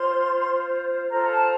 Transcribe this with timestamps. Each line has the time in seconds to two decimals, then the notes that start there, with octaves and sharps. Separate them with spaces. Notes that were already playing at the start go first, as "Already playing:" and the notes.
Already playing: F4 C5 C6
1.10 F4 A4 C5 A#5
1.32 A5